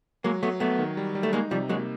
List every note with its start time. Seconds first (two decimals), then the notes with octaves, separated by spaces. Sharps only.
0.24 F#3 G#3 A#3
0.43 F#3 A3 B3
0.60 F#3 A3 B3
0.79 D#3
0.97 G3
1.15 G3
1.23 A3
1.33 G#3 A#3 D#4
1.51 C3 F3 G3
1.69 F#3 G#3 A#3